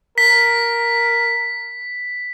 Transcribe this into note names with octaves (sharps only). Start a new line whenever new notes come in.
A#4 B6